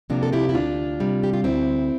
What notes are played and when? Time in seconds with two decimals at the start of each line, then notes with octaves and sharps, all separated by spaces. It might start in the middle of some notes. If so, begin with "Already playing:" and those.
0.10 C3 F3 A#3 D4
0.23 A4
0.33 E4 G4
0.49 E4
0.54 D2 D4 F4
1.00 C3 G3
1.23 G4
1.33 F4
1.44 D2 C4 E4